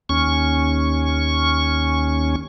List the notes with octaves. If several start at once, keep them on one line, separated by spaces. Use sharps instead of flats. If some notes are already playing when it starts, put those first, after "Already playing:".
D#2 C#4 C#6